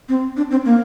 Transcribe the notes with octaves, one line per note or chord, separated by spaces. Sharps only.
C4
D4
C4
A#3